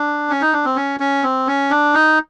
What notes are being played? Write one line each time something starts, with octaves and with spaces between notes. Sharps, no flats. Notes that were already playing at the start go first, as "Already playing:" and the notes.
Already playing: D4
C#4
D#4
D4
C4
C#4
C#4
C4
C#4
D4
D#4